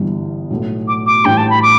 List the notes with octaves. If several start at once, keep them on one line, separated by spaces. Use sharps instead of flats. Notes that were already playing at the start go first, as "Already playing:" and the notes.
Already playing: G1 G2 E3 G3 B3
B1 A2 A3
D6
D6
A1 A2 G3 D4 G5
A5
B5
D6